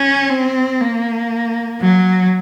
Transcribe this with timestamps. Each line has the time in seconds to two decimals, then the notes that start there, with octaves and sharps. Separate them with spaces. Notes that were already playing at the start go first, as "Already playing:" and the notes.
Already playing: C#4
0.30 C4
0.81 A#3
1.81 F#3